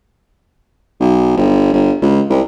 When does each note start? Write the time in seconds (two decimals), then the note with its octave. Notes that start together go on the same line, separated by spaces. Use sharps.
1.00 B1
1.37 G1
1.73 G1
2.02 C#2
2.30 C2